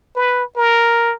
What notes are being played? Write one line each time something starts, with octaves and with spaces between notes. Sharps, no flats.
B4
A#4